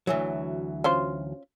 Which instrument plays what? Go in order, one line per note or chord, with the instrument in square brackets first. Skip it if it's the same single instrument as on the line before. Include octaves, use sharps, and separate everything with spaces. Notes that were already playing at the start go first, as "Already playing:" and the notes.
[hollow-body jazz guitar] D2 E3 F#3
[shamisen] C#4 F4 C5